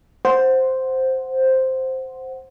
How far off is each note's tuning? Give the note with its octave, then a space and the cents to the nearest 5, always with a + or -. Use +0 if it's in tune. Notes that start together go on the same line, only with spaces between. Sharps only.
C5 +0 F#5 +0